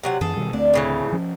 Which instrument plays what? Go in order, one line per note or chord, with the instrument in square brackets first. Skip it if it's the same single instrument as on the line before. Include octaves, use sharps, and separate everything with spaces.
[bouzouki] C3 F#3 F#5
[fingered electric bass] F#2 E3 [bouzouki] G#4 A4
[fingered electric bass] B2 D#3 G3
[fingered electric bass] D2 A3 C4 [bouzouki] D4
[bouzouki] A2 C#3 E3
[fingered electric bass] F3 C#4